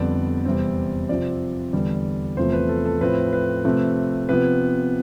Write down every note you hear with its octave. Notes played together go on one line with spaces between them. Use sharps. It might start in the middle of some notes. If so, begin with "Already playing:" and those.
Already playing: F2 D3 G3 B3 D5
E2 C3 G3 C4
C3 F3 C4 D5
E2 D3 G3
E2 C3 F3 A3 C5
B4
A4
A4
A2 F3 A3 C4 B4
B4
C3 F3 A3 C4
C3 F3 B3 B4